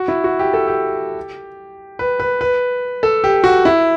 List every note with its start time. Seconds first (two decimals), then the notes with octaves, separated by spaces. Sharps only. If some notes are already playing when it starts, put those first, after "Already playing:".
Already playing: F#4
0.08 E4
0.24 F#4
0.39 G4
0.53 A4
0.68 G4
1.99 B4
2.20 B4
2.41 B4
3.03 A4
3.24 G4
3.44 F#4
3.65 E4